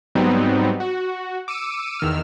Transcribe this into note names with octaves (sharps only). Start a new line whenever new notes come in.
G#2 F#3 G3 B3 C4 D#4
F#4
D6 E6 C#7 D#7
E2 D#3 E6 F6